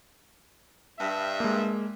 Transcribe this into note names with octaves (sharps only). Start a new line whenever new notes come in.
G2 E5
G#3 A#3